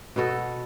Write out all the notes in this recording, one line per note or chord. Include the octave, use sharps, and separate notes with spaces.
B2 B3 F#4 A4